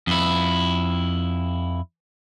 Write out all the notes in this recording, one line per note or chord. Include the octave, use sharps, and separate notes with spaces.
F2 E4